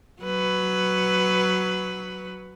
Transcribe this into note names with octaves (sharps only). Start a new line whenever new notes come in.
F#3 B4